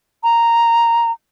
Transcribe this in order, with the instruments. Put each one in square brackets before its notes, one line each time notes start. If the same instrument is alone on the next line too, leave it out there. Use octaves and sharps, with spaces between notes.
[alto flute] A#5